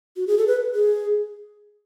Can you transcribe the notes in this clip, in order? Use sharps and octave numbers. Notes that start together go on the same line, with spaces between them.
F#4
G#4
A4
B4
G#4